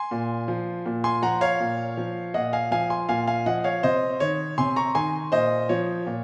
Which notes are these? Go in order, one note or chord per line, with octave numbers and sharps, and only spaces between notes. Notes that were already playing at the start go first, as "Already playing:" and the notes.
Already playing: G#5 C6
A#2
F3
A#2
G#5 C6
F3 F#5 A#5
C#5 F5
A#2
F3
A#2 D#5 F#5
F5 G#5
F3 F5 G#5
G#5 C6
A#2 F5 G#5
F5 G#5
F3 D#5 F#5
C#5 F5
C3 C5 D#5
D#3 C#5
C3 G#5 C6
A#5 C#6
D#3 G#5 C6
A#2 C5 D#5
F3 C#5
A#2